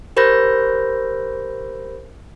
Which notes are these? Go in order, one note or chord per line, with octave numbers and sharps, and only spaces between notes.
G4 A#4 C5 B5 G6 A#6